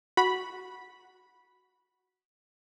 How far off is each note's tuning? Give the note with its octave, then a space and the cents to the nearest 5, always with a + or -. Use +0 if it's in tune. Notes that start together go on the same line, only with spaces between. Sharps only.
F#4 +0 B5 -10